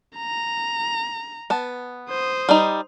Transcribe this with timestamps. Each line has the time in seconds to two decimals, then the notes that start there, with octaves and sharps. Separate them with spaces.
0.17 A#5
1.50 B3 A5
2.10 C5 D#6
2.49 G3 D#4